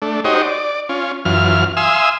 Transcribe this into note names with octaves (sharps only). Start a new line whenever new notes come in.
A3 D4
D#4 F#4 G4 C5 C#5 D#5
D5
C#4 F4
F#2 E3 F4 F6
E5 F5 G#5 C6 D#6 E6